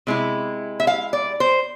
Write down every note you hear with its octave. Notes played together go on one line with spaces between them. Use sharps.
C3 G#3 E4
E5
F5
D5
C5